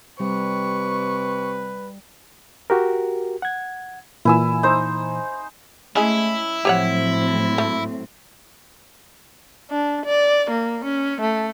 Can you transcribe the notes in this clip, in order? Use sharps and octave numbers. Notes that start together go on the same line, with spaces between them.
C3 G3 B4 C#6
F#4 G4 A#4
F#5 G#6
A#2 E3 E4 G#5 E6
D#4 C5
G#3 A3 C#4 E4 G#4
A2 F3 F#3 C4 G4 C#5 F#5
A3
D4
D5
A#3
C#4
A3